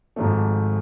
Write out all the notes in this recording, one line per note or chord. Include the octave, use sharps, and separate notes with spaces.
G#1 G#2 F3 A3 A4